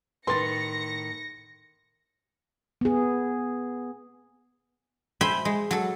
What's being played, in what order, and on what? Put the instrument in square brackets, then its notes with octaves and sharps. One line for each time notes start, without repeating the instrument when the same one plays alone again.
[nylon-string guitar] A2 D#3 [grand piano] B4 [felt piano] C6 A6 [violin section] A#6 C#7
[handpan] B3 G#4
[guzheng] C5 E5 G5 G#5 B5
G#3
F#3 A4